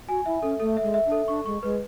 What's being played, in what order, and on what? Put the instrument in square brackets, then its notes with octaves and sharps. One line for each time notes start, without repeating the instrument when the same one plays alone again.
[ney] F#4 [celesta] G#5
[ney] E4 [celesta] E5
[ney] C#4 [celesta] A4
[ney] A3 [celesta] A4
[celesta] E5
[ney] G#3
[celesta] E5
[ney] D4
[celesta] A4
[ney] D4 [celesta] C#6
[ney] G#3 [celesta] C#6
[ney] G#3 [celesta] B4